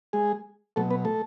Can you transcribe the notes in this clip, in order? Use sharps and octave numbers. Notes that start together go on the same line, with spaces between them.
G#3 G#4
B2 F#3 A3 A4
B3 B4
A3 A4